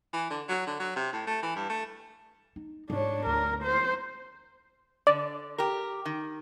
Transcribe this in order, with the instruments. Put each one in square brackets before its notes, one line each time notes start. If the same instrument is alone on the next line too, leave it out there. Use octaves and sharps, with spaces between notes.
[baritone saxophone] E3
D3
F#3
D3
F#3
C3
A2
A3
E3
G2
A3
[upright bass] D#4
[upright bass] G#2 [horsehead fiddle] D4 C#5
[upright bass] D2 [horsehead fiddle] A#4
[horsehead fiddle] C5
[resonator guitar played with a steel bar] D3 [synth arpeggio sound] D5
[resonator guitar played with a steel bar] G4 A#4
D#3